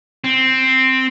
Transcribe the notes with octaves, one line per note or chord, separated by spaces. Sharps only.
C4